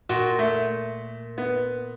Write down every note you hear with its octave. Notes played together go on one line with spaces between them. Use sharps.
A#2 F#4
A3
B3